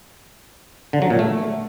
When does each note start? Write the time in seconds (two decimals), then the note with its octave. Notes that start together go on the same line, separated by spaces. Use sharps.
0.93 D3
1.02 F#3
1.10 A#2
1.19 A3